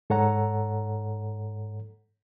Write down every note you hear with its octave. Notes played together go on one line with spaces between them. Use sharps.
G#2 A4 C#5 F#5 A#5